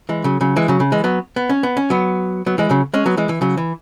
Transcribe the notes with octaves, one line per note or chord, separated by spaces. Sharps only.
E3 G#3
C#3 F#3
C#3 F#3
E3 G#3
C#3 F#3
C#3
E3 G#3
F#3 B3
B3
C#4
B3
C#4
F#3 B3
F#3 B3
E3 G#3
C#3 F#3
G#3 C#4
F#3 B3
E3 G#3
E3
C#3 F#3
E3